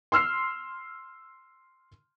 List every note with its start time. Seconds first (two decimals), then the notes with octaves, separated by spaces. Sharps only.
0.12 C6 E6 F6 C7